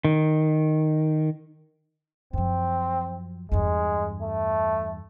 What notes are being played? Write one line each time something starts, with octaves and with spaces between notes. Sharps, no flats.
D#3
F#2 F3 C4
E2 G2 G#3
A3